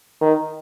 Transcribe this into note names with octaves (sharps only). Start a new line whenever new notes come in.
D#3